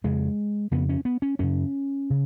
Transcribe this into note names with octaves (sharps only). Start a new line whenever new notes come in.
F2 C#3 G#3
F2 C#3 B3
C#4
B3
C#4
F#2 C#3 C#4
C#3